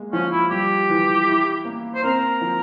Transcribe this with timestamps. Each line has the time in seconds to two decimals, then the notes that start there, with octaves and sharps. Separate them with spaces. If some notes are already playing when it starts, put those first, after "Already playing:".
Already playing: G#3 A#3
0.12 F3 C#4
0.31 E4
0.50 G3 G4
0.89 E3
1.27 E4
1.65 A#3
1.95 C5
2.04 C4 A#4
2.41 F3